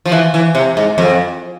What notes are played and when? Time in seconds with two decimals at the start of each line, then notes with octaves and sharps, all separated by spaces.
0.06 F3
0.12 E3
0.34 E3
0.55 C3
0.77 G#2
0.98 F2